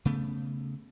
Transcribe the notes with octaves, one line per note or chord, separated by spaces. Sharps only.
C#3 A3 B3